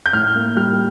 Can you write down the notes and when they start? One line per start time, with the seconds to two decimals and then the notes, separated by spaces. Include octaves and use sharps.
0.06 G6
0.13 A2 F6
0.35 A#3
0.56 G3 F6